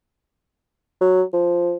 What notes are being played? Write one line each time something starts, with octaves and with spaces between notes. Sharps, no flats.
F#3
F3